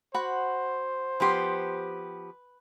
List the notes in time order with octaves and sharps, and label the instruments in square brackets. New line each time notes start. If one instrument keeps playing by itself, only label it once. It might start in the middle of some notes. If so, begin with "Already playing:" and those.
[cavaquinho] F#4 F#5 B5 [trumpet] C5
[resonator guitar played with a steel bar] F3 B3 G4 [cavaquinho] B4 C6